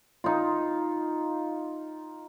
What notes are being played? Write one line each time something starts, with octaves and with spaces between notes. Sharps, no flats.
D#4 F4